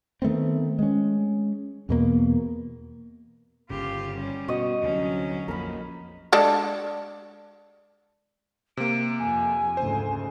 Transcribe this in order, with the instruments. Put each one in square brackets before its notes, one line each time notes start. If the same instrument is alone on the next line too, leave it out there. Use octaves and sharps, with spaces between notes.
[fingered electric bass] D#3 A3 B3 C4
G#3 C#4
E2 B2 A#3
[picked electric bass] G1 C#3 [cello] F4 G4
[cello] G3 C#4
[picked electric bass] B2 [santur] F#4 D#5
[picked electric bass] D2 C3 [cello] F#3 C#4
[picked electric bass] A#1 F2 A#2 [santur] A#4 B5
[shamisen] G#3 D4 A4
[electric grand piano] C3 A#3 [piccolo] D7
[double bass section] F2 [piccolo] G#5
[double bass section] D2 G#2 C#3 [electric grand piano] C5